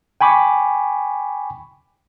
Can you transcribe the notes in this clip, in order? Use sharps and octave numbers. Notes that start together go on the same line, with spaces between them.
G5 G#5 B5 C#6 D6